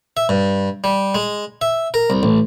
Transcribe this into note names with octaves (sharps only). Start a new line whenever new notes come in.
E5
G2
G3
G#3
E5
A#4
C2
A1